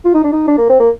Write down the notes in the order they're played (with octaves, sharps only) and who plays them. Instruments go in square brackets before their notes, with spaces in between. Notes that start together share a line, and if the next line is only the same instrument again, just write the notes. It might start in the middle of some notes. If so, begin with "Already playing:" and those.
[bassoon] F4
D#4
D4
D#4
D4
A#3
C4
A#3